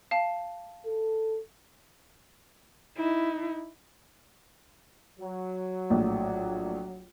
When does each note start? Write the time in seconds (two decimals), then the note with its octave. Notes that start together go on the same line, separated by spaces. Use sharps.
0.11 F5 A5
0.86 A4
2.96 D#4 E4
5.19 F#3
5.90 A#1 A2